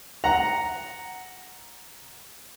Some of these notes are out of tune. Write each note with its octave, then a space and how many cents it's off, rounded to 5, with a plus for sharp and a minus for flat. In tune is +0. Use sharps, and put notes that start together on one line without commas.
F#5 +0 A#5 +0